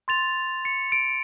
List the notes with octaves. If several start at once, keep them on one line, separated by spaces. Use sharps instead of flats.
C6 A6 F7
C#7
C#7 D7